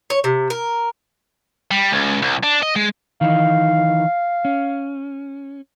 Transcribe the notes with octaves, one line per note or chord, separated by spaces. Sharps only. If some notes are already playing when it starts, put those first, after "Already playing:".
C#5
C3
A#4
G3
C#2
C2
D4
D#5
G#3
D#3 E3 D#4 F5
C#4